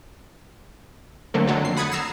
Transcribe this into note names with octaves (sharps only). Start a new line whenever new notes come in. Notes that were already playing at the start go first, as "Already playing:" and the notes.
D3 F#3 A3 A#3 C4
D3 D#3 F#3 A4
F2 C7
F#5 B5 D#6 G#6 A6 C#7
A#5 E6 C7 E7